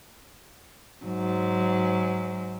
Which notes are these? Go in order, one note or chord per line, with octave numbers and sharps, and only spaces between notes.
G#2 F#3